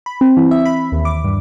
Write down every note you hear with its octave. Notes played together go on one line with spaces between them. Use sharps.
B5
C4
E3
E5
B5
D#2
D6
G2